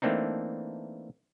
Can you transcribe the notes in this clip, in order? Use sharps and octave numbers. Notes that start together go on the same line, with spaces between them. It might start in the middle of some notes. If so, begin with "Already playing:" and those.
E3 A3 A#3 C4 D4 D#4